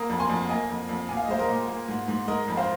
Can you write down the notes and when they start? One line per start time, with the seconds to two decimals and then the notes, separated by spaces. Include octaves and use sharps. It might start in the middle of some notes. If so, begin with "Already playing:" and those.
Already playing: A#3 A#5 D#6
0.09 F2
0.19 G#5 C6
0.29 F2
0.49 A#3 D#5 G#5
0.69 F2
0.89 F2
1.08 A#2 G#5
1.17 F5
1.24 D#5
1.29 G#3 C5 F5
1.39 A#4 D#5
1.48 A#2
1.68 A#3
1.88 G#2
2.08 G#2
2.28 G#3 A#4 D#5
2.48 F2
2.57 C5 F5